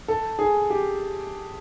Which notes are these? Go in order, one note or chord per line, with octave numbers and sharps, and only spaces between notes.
A4
G#4
G4